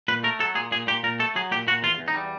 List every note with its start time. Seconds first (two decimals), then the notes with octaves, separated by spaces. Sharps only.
0.08 A#2 B4
0.24 A3 A#4
0.39 F#3 A4
0.55 A#2 G#4
0.71 A#2 G#4
0.87 A#2 G4
1.03 A#2 A#4
1.19 A3 A4
1.36 F#3 G#4
1.51 A#2 G4
1.67 A#2 F#4
1.83 E2 F4
1.99 E2
2.08 D#4
2.14 G3